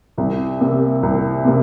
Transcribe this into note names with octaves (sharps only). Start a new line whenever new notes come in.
C2
C3 A#3
C2
C3 A#3